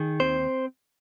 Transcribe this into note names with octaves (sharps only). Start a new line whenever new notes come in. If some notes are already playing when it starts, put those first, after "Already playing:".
Already playing: D#3 G#4
D#2 C4 C5